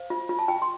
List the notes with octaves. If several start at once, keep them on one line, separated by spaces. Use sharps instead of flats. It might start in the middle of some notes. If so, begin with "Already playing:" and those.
Already playing: C5 F5
F4
F4
A5
F4 G5
C6